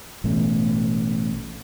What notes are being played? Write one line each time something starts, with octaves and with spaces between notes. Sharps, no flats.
A1 B2 A3